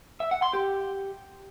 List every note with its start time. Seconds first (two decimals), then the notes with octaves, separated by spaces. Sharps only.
0.20 E5
0.31 F#5
0.42 C6
0.53 G4